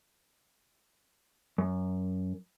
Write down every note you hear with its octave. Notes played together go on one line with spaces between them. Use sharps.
F#2